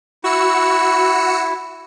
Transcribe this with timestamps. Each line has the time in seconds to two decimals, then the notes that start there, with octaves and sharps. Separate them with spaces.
0.24 E4 F#4 E6 C#7